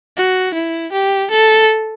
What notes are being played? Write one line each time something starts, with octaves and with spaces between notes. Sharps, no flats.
F#4
E4
G4
A4